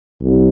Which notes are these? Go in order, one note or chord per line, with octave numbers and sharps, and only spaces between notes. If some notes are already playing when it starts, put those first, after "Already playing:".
C2